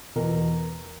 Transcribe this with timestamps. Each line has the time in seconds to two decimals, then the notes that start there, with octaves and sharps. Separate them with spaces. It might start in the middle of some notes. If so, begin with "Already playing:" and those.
0.15 E2 B2 A#4